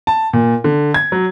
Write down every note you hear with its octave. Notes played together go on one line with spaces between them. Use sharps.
A5
A#2
D3
G#6
F#3